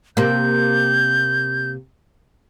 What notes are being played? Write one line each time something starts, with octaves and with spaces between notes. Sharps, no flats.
C3 A#3 G6